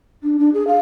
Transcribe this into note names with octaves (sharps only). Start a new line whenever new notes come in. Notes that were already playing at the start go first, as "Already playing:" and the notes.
D4
D4
G#4
F5